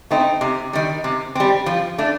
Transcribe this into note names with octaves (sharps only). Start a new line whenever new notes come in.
A3 C4 D#4
C3
D#3 G3
C3
G3 C4
F3
A3 D4